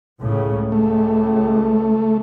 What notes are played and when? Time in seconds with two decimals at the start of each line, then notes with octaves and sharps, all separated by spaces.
0.22 C#2 A2 C#3
0.72 C#2 A3